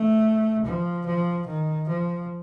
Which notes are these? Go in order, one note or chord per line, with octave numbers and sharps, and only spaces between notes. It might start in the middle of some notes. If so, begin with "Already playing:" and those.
Already playing: A3
F3
F3
D#3
F3